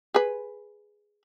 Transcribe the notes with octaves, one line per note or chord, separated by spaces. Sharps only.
G#4 B4